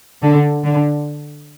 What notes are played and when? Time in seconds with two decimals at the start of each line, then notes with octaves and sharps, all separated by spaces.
0.23 D3
0.64 D3